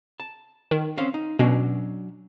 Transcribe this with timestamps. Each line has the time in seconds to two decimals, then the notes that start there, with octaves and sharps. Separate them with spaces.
0.20 A5
0.71 D#3
0.97 C4 C#4 F5
1.14 D#4
1.39 B2 F#3 C#4 D4